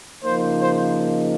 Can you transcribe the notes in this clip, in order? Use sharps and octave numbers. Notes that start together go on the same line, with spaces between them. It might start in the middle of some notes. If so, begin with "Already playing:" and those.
C#3 F3 A#3 D#4 C5
C5